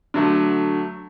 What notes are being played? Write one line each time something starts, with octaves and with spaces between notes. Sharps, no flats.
D3 F#3 A3